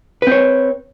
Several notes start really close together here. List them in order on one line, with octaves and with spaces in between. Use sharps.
B4 C4 C#5